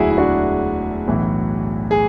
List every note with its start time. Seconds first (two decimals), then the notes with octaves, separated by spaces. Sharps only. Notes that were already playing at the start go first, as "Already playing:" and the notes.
Already playing: E1 D2 D3 F#3 E4 F#4 G#4
0.11 E4
0.18 D4 F#4
1.08 B1 A2 E3
1.91 G#4